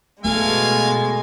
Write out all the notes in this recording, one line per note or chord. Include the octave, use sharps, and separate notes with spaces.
B2 G#3 A3 A4 F5 G#5